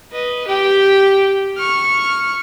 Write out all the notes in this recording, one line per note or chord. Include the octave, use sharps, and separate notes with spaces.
B4 D#5
G4 G5
C#6 F6